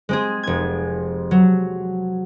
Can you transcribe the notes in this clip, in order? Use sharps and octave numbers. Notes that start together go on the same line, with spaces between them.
G#3 C4 G#4
F1 G#6
F#3